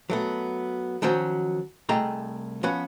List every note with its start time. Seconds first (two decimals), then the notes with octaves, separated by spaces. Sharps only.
0.10 F#3 A3 B3
1.02 D#3 F3 F#3 C#4 F#4 C5
1.89 C2 A3 G#4 D#5 G5 A#5
2.63 F3 B3 C#4 B4